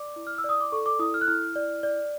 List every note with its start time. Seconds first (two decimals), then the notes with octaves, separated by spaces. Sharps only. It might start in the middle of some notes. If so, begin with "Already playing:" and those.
Already playing: D5 D6
0.16 E4
0.27 F6
0.38 E6
0.44 D5 D#6
0.61 D6
0.72 A4 C#6
0.86 D6
0.99 E4 D#6
1.14 F6
1.21 F#6
1.28 E4 F6
1.55 D5
1.83 D5